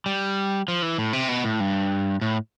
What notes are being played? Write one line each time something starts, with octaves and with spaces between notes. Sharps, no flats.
G3
F3
E3
A2
C3
B2
A2
G2
A2